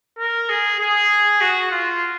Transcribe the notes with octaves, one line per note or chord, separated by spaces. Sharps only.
A#4
G#4
G#4
F#4
F4